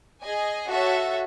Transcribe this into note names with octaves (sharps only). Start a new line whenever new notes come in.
G#4 D#5 G#5
F#4 A4 C#5 E5